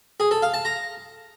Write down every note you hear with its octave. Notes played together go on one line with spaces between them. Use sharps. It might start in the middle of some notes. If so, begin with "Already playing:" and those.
G#4
A4
F5
A5
A#5